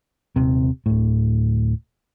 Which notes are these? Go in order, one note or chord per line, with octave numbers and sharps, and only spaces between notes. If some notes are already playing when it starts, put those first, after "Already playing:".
D#1 C3
D1 A2